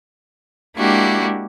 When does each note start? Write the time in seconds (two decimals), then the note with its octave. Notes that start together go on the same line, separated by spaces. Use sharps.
0.77 G#3 A#3 D4 E4 F#4 G4